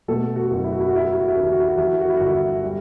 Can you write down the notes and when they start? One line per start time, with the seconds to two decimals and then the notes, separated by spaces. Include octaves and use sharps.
0.08 B2 A3 A4
0.36 F#4
0.51 F#1
0.64 E4
0.72 F#4
0.80 E4
0.88 F#4
0.92 F#3 E4
1.05 F#4
1.13 E4
1.20 F#4
1.28 E4
1.35 D#2 F#4
1.44 E4
1.52 F#4
1.60 E4
1.68 F#4
1.77 E3 E4
1.85 F#4
1.93 E4
2.01 F#4
2.10 E4
2.17 F#4
2.20 G1 E4
2.64 G3